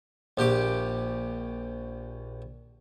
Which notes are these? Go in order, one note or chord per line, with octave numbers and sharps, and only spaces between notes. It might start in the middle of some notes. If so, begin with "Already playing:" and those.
A#1 G4 G5 D6